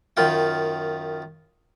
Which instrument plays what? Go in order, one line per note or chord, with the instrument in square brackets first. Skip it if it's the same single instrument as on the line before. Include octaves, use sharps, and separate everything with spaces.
[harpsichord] F#2 D#3 F4 G5